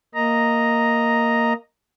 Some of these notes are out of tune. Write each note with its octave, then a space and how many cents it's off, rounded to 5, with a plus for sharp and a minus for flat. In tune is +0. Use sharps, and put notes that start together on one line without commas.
A#3 -5 D#5 +0 A#5 +0